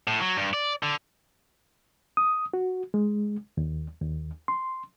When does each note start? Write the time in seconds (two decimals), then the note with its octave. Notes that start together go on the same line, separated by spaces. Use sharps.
0.07 A2
0.21 F#3
0.37 G2
0.54 D5
0.83 D3
2.17 D#6
2.54 F#4
2.94 G#3
3.57 D#2
4.02 D#2
4.48 C6